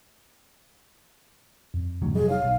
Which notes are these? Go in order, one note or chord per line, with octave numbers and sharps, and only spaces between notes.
F2
A1 D2 F#3
F1 F#3 G3 G#4 D#5
D#4 C#5 F5
B1